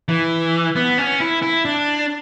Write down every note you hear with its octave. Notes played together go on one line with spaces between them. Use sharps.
E3
B3
C#4
E4
E4
D4